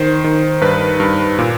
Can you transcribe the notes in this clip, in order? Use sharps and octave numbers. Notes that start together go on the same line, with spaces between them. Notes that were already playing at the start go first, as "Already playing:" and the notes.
Already playing: D#3 C5
D#3
G2 B4
G2
A#2